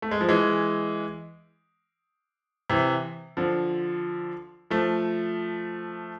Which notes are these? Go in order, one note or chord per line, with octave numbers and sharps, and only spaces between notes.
A3
G#3
F3
E3 G#3
C3 E3
D3 F3
F3 A3